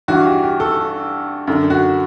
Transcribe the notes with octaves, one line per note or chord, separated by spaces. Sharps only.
G2 E3 F#4
G4
G4
A4
F#2 D3
F#4